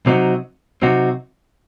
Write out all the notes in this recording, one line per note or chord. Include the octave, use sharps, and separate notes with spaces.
C3 F#3 C4 D#4 F#4
C3 F#3 C4 D#4 F#4